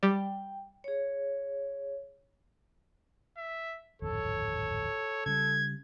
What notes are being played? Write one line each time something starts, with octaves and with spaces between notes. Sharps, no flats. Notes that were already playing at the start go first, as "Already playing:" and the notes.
G3 G5
G#4 C#5
E5
D1 G#1 F2 A4 C#5
C#3 G3 G#6